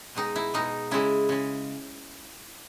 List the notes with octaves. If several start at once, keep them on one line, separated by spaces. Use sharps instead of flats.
B2 G#3 D#4
E4
B2 G#3 D#4
C#3 G#3 E4
C#3 G#3